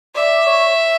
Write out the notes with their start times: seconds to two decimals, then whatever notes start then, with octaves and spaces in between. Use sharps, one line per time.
0.15 D5 E5
0.46 C#5